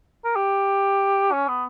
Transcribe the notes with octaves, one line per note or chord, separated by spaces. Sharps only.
A#4
G4
C#4
B3